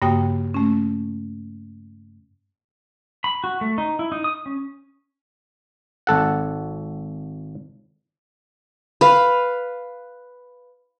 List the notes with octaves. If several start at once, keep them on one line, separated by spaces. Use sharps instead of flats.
G2 C#3 A#3 F#4 G5 D#6
A3 C#4
B5
F#4
A3
D#4
E4
D#4
D#6
C#4
G#1 A4 F#5
B4 F5